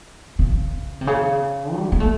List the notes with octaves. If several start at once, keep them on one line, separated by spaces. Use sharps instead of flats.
C#3
C3
C#3
G3
A#3
A3